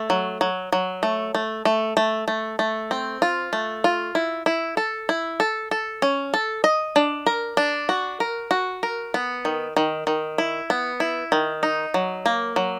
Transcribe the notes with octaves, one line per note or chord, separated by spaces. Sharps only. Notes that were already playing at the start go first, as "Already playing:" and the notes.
Already playing: A3
F#3
F#3
F#3
A3
A3
A3
A3
A3
A3
C4
F4
A3
F4
E4
E4
A4
E4
A4
A4
C#4
A4
D#5
D4
A#4
D4
F#4
A#4
F#4
A#4
B3
D#3
D#3
D#3
E4
B3
E4
D#3
D#4
F#3
A#3
F#3